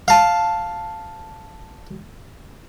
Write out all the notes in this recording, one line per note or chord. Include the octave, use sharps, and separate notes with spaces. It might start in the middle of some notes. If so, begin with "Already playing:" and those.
F5 A5